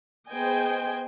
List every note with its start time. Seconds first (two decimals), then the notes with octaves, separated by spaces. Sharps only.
0.31 B3 G#4 C5 D#5 G5 G#5